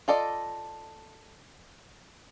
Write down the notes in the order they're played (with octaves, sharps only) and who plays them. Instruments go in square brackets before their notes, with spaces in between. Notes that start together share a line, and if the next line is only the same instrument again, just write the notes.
[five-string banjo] F4 A4 D5 D#5